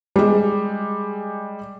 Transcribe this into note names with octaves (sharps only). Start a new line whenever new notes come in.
G3 G#3